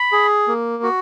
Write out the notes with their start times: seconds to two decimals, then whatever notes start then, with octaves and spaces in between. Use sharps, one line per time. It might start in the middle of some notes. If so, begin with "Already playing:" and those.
Already playing: B5
0.12 G#4
0.48 A#3
0.83 F#4